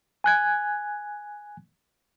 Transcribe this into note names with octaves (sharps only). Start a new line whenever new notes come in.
G#5 F#6 G#6